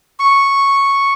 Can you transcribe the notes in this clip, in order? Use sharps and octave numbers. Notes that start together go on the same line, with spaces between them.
C#6